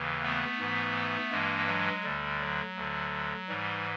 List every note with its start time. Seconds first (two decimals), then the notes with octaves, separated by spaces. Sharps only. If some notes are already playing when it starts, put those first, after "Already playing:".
Already playing: D#2 C#3 E3
0.23 A3 B3
0.59 G#2 E3
1.31 G2 E3 G#3 A#3
1.67 F#3 G#3
2.03 D2 D3 G3
2.40 F#3
2.76 D2 D3
3.48 G#2 E3 G3